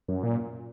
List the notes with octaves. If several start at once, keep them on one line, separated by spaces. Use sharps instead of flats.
F#2
A#2